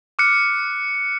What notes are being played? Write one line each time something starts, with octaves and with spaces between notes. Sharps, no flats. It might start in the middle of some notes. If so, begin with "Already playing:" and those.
D6 F6 F#6 C#7